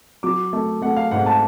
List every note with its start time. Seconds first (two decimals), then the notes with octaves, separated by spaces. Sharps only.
0.23 F#3 D6
0.53 A3
0.82 A3 F#5
0.97 F5
1.11 G#2 F#5
1.26 A5